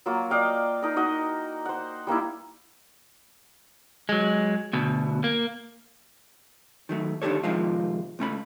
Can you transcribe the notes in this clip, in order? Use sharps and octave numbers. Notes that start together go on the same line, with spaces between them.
F#3 A#3 F4
D5 D#5 F5 G5
D#4 A#4
D#4 F#4 D#5 F#5
C5 F#5
G3 A#3 D#4 E4
F#3 G#3
D2 B2
A#3
D#3 F#3 A3
D3 D#3 F#3 G4 A4 C#5
F2 C3 D#3 F3 G#3 F4
C#2 A3 C#4 B5